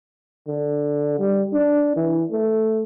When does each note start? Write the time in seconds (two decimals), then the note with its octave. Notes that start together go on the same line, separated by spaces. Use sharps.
0.47 D3
1.19 G3
1.53 D4
1.96 E3
2.31 A3